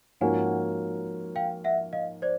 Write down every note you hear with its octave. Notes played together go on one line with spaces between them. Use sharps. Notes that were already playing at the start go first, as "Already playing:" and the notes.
G#2 F3 A#3 C#4 F#4 F#5 G#5
F5 G5
E5 F#5
D#5 F5
C5 D5